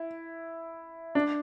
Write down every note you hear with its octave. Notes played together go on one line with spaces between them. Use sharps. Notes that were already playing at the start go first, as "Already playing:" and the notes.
Already playing: E4
D4